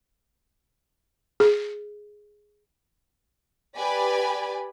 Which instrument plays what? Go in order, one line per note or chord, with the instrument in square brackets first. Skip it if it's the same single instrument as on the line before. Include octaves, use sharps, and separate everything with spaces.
[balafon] G#4
[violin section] G4 B4 D5 G#5 B5